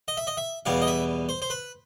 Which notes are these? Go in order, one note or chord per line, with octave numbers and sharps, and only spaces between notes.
D#5
E5
D#5
E5
E2 B2 G3 F5
D#5
E5
C5
C5
B4